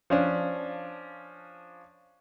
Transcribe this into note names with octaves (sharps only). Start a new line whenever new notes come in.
F3 C#4 D4